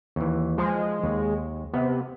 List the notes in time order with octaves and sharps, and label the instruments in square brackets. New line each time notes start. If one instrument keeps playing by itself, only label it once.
[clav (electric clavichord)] D#2 E3
[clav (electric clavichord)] F3 [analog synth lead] G#3
[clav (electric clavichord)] D#2
[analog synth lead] C3 [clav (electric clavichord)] B3